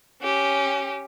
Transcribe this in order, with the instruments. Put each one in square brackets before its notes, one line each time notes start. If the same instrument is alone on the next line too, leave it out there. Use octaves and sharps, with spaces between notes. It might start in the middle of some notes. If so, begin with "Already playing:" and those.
[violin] C#4 G4